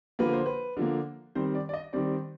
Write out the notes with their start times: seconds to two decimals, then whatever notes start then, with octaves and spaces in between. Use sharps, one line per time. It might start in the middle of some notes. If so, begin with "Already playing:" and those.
0.19 D3 F3 A#3 B4
0.33 C5
0.46 B4
0.77 D3 F3 A#3
1.35 D#3 G3 C4 C5
1.55 D5
1.69 D5
1.74 D#5
1.93 D#3 G3 C4 D5